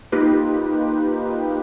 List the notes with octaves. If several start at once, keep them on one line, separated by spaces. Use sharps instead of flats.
A#3 D#4 F4 G4 B4